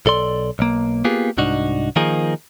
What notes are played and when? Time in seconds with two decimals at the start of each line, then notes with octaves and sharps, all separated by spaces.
0.06 B1 A4 D5 C6
0.59 B1 A#3
1.05 A#3 B3 F4 G4 G#4
1.38 C2 G#2 D4 D#4 F#4
1.96 D#3 F3 A#3 D#4 G#4